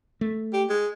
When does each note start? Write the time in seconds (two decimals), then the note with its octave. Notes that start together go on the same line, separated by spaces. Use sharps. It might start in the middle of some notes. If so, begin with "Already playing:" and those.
0.21 A3
0.53 G4
0.70 G#3